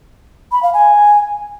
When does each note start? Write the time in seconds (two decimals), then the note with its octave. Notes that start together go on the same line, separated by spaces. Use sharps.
0.52 B5
0.63 F5
0.74 G#5